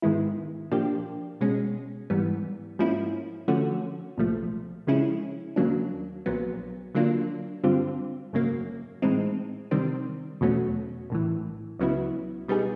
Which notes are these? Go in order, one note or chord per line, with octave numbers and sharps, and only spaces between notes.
G#2 D#3 G#3 B3 E4
A#2 F3 A#3 D4 G4
B2 G#3 C#4
G#2 E3 G3 B3
G#2 F3 A#3 C#4 E4
D3 F3 A3 C#4 F#4
C2 A#2 F3 A3
C#3 F3 G#3 C#4 E4
D#2 C#3 F#3 A#3 D4
A#1 A#2 F#3 B3
D3 F#3 A#3 D4 F4
G2 D3 G3 C4 F4
G#1 F#2 C#3 F#3 A#3
A2 E3 G#3 C4 D#4
C3 D#3 G3 C4
E2 B2 F#3 A3 C#4
A#1 A2 E3
C#2 C#3 F#3 B3 E4
B2 G3 B3 D#4 G#4